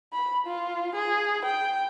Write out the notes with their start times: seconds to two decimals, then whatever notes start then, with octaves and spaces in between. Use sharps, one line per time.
0.14 B5
0.47 F4
0.95 G#4
1.46 G5